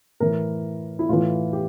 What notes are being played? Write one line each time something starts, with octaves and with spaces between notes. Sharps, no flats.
A2 E3 A#4
E4
A2 E3 F4
G4